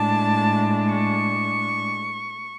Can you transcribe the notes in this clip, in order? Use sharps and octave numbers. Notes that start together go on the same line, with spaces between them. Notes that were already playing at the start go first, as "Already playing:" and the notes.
Already playing: A2 G#3 D4 A5
C#6